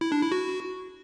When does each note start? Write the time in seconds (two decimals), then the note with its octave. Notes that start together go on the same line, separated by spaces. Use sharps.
0.01 E4
0.12 D4
0.22 E4
0.32 F#4